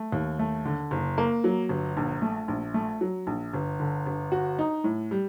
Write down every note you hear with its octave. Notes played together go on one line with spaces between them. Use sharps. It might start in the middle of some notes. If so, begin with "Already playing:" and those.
Already playing: A3
D#2
A3
D3
F#1
A#3
F#3
G1
A#1
A3
A#1
A3
F#3
A#1
G1
D3
G1
F#4
D#4
A2
G3